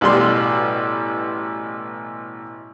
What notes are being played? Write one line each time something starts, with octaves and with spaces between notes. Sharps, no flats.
A1 B2 G3 C6